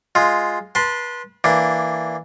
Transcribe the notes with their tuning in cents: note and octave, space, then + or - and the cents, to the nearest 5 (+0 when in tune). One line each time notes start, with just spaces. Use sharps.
G#3 +0 F4 +0
B4 -30 A5 +0 C6 +0
E3 -5 A#3 +0 D4 +0